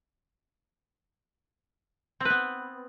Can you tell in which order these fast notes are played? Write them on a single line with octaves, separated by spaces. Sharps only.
C4 B4 B3